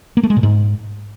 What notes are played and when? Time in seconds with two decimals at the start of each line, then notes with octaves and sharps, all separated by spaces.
0.17 A#3
0.23 A3
0.30 G#3
0.36 A#2
0.43 G#2